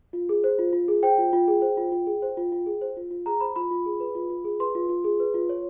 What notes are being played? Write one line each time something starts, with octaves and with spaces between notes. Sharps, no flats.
F4
G#4
C5
F4
F4
G#4
C5 G5
F4
F4
G#4
C5
F4
F4
G#4
C5
F4
F4
G#4
C5
F4
F4
G#4 A#5
C5 B5
F4 B5
F4
G#4
B4
F4
F4
G#4
B4 C6
F4
F4
G#4
B4
F4
C#5